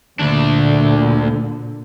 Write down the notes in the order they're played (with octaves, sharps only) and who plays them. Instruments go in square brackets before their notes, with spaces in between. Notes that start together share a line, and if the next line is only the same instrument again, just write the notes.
[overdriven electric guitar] D2 D4 [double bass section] A#2 D3